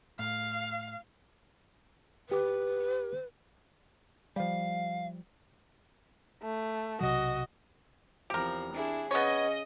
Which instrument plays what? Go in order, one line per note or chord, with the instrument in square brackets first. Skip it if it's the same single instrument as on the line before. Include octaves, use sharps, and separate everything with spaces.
[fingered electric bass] A2 [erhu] F5
[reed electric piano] D2 G4 D6 [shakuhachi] B4
[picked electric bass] F3 G3 [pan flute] F5
[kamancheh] A3
[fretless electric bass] B1 C3 F#3 [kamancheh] F#4 D#5
[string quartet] E2 C3 F3 [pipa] G4 A#4
[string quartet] D4 E4 G#4
[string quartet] C#3 C#4 [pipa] B3 C#5 [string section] D#5